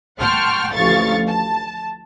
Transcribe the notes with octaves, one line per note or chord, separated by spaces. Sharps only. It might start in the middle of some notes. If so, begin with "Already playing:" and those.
F#5 G5 A5 C6 C#6 F6
A1 D2 F3 F5 C#6 A6
A5